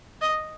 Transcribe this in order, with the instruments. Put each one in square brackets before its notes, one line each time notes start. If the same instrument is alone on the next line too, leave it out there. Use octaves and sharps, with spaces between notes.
[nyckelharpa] D#5